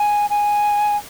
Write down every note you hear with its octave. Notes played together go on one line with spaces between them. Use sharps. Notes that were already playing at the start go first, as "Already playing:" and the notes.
Already playing: G#5
G#5